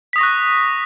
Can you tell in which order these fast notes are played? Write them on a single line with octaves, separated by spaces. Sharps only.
B6 D#6 A#6 C#6 F#6